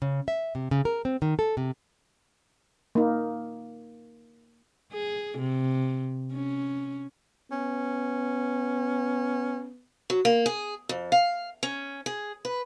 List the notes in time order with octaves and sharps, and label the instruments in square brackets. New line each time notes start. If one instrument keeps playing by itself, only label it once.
[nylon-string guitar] C#3
E5
C3
C#3
A#4
C4
D#3
A4
C3
[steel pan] A#3 D#4
[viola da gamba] G#4
C3
C#4
[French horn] B3 [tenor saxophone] C#4
[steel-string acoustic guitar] F#3
A#3
G#4
F2
F5
C#4
G#4
B4